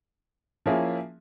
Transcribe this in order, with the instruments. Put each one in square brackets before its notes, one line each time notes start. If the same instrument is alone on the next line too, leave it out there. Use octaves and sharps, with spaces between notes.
[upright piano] F3 A#3 C#4 E4 G#4